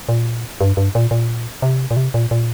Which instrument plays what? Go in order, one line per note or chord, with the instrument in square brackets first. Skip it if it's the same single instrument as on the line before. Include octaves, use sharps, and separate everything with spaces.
[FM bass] A#2
G2
G2
A#2
A#2
C3
A#2
C3
A#2
A#2